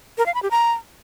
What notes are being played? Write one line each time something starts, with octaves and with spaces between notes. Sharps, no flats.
A#4
F5
B5
G4
A#5